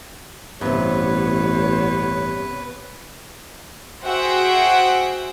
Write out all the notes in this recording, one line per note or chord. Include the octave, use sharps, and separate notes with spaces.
A1 G2 C3 B3 B4 C#5
F#4 G#4 C5 E5 F#5 G5